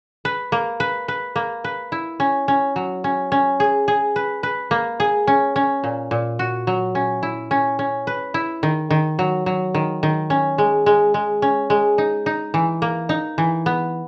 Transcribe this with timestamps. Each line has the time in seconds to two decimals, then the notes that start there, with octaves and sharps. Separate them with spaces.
0.25 B4
0.52 A#3
0.80 B4
1.08 B4
1.36 A#3
1.64 B4
1.92 E4
2.20 C#4
2.48 C#4
2.76 F#3
3.04 C#4
3.32 C#4
3.60 G#4
3.88 G#4
4.16 B4
4.43 B4
4.71 A#3
5.00 G#4
5.27 C#4
5.56 C#4
5.84 A#2
6.11 A#2
6.39 F#4
6.67 F#3
6.95 C#4
7.23 E4
7.51 C#4
7.79 C#4
8.07 B4
8.34 E4
8.63 D#3
8.90 D#3
9.19 F#3
9.46 F#3
9.74 D#3
10.03 D#3
10.30 C#4
10.58 G#3
10.86 G#3
11.14 G#3
11.42 C#4
11.70 G#3
11.98 D#4
12.26 D#4
12.54 E3
12.82 A#3
13.09 D#4
13.38 E3
13.66 B3